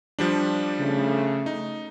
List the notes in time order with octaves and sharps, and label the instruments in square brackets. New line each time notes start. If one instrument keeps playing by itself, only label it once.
[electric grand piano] F3 G3 D4
[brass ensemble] C#3 A3
[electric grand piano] D#4